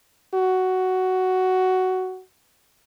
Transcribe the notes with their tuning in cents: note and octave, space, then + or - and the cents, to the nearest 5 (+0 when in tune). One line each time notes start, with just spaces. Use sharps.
F#4 +10